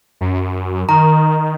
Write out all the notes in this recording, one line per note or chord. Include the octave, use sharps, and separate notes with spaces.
F#2
D#3 A#5